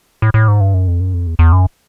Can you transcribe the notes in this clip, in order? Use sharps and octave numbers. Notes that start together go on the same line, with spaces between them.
A2
A2
G#2
G2
F#2
F2
F#2
F2
E2
E2
F#2